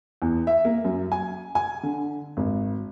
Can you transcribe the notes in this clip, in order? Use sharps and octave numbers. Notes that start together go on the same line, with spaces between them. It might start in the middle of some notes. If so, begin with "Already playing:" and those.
E2
E5
A#3
F#2
G#5
G#5
D3
G#1